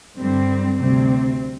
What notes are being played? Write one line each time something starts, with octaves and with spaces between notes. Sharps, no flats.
G2 D3 G3 C4
D2 C3 G3 C4